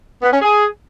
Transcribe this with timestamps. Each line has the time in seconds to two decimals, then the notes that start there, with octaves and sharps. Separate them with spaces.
0.22 B3
0.32 C#4
0.42 G#4